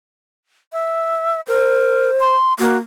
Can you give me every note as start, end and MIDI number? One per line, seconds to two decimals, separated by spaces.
0.73 1.41 76
1.48 2.11 70
1.48 2.33 72
2.20 2.53 84
2.59 2.76 58
2.59 2.78 66